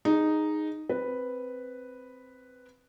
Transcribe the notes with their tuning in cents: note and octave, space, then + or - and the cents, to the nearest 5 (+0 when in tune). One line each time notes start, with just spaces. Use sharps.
D#4 -5 G#4 +0
C4 +0 B4 +0